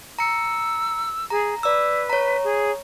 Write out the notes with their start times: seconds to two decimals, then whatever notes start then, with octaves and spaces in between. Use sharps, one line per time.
0.19 A#5 E6 C#7
1.30 G#4 A#5
1.63 B4 D5 E6
2.10 C#5 A#5
2.44 G#4